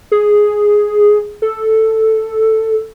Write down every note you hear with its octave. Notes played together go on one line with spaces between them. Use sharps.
G#4
A4